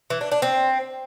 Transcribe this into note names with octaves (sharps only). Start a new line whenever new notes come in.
E3
D4
D4
C4